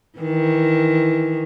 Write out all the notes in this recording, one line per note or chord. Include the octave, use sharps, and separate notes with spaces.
D#3 E3